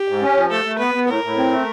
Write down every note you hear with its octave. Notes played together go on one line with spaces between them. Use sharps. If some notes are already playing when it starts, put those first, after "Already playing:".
Already playing: G4
G#2
C#4
F3
A3 A4
A3
B3 B4
B3
A2 A#4
A2
C4
A3